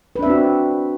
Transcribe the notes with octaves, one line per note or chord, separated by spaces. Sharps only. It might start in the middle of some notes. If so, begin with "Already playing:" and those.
C4 D4 F#4 B4 E5